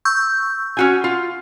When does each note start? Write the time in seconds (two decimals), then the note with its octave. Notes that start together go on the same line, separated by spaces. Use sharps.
0.05 C#6 E6 G6
0.77 C#4 F#4 G#5
1.04 F4